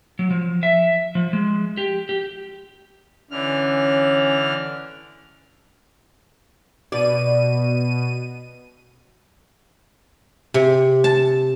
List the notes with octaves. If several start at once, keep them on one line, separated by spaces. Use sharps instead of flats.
F#3
F3
E5
F3
G#3
G4
G4
D3 E3 C#4 F6
B2 D5 D#7
C3
A5